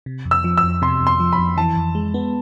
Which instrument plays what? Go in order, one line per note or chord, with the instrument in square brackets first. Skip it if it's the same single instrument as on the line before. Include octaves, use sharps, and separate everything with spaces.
[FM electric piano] C3
F2
[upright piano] E6
[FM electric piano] F3
[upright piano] E6
[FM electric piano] F2
[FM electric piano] C3 [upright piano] C6
[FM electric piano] F2
[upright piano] C6
[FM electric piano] F3
[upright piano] B5
[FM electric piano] F2
[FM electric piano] E3 [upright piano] A5
[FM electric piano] F2
G#3
B3